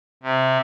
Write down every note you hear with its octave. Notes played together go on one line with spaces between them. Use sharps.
C3